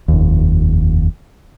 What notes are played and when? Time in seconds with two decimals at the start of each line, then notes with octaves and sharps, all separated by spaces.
0.08 F1 D#2